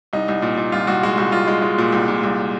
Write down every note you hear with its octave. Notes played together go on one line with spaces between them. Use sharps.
C2 D#4
C2
A#2
A#2
C2 F4
C2 F#4
G#3 F#4
C2 F#4
C2 F4
G#3
G#3
A#2
C2
A#2
C2